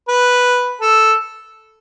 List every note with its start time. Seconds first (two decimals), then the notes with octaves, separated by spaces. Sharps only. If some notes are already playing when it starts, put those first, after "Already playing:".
0.08 B4
0.81 A4